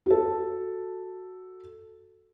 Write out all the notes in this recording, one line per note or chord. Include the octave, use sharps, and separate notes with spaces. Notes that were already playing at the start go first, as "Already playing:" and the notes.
F#4 A4